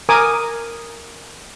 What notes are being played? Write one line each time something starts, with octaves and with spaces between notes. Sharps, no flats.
A#4 G#5 D6 D#6